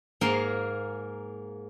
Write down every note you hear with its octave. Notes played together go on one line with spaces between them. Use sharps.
G#2 A#3 G#4 A#4 F5 C6